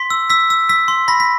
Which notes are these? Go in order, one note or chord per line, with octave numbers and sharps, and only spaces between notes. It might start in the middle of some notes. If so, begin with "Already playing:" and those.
Already playing: C6 B6
E6
E6 B6
E6
E6 B6
C6
B5 A#6
B6